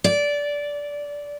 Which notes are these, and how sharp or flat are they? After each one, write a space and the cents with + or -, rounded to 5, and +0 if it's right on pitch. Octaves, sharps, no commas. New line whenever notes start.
D5 -15